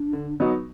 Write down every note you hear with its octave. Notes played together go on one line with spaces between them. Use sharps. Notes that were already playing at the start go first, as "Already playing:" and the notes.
Already playing: D4
D3
F#3 B3 D#4 F#4